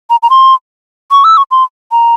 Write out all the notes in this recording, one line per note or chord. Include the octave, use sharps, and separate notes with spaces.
A#5
A#5
C6
C#6
E6
C#6
C6
A#5